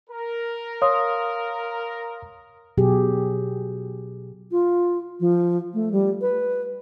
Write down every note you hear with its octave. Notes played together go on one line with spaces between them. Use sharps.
A#4
C#5 F5 C6 D#6
B2 F#3 G4 G#4
F4
F3
A3
G3
B4